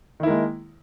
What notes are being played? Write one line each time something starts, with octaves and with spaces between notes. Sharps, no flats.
D#3 G#3 A#3 E4